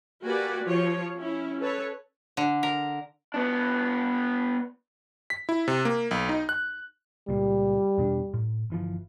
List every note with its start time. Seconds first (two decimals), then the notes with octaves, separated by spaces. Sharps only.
0.23 A#3 F#4 G4 B4 D5 G#5
0.64 F3 C#5
1.18 C#4 E4
1.60 A4 B4 C#5
2.37 D3
2.63 A#4
3.34 B3 D4
5.30 B6
5.49 E4
5.68 C3
5.85 A#3
6.11 B1
6.29 D#4
6.49 F#6
7.29 C#2 A#2 G3
7.98 E2 B2 D4
8.34 A2
8.70 G1 E3 F3